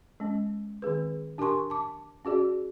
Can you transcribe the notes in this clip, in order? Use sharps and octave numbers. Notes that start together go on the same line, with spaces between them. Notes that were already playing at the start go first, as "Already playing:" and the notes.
G#3 C#4
D#3 C4 G#4 B4
D4 G4 A#4 G#5 C6 C#6
A5 D6
C#4 F#4 G#4 D5